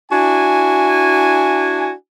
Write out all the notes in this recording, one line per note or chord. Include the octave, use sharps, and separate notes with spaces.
D4 E4 F#4 G#5